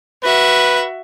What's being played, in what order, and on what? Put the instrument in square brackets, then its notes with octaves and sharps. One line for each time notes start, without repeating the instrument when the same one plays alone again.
[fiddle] F#4 E5 [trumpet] B4